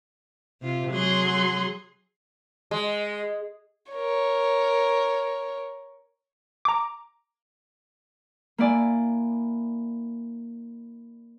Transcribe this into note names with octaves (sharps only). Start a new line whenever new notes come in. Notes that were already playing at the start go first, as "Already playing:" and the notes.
C3 F4
F#3 G#4 C6
G#3
A#4 C#5
A#5 D6
A#3 E4 D5 G#5